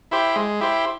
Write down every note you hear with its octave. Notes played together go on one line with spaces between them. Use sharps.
E4 G4 C5
G#3
E4 G4 C5